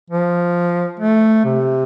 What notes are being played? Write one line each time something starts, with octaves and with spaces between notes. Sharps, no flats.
F3
A3
C3